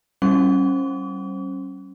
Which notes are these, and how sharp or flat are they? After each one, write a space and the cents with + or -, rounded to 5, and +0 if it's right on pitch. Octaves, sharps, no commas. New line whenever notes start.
G3 -40 C#4 -20 D6 -45